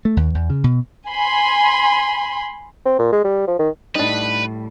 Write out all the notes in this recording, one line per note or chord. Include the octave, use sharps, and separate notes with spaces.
A3
D#2
E2
C#3
B2
G#5 B5 C6
C4
A#2
G#3
G3
F3
D#3
A2 G3 D4 D#4 B4